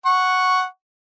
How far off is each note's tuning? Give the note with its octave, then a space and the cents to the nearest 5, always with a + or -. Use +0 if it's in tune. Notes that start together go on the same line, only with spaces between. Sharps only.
F#5 +0 C#6 +0